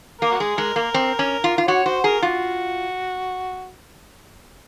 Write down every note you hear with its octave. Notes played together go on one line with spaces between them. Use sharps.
A#3 A#4
F#4
G#3 G#4
G#3 A#4
A#3 A#4
C4
C#4
F4
F4
F#4 C#5
F#4 C5
G#4 A#4
F4 F#4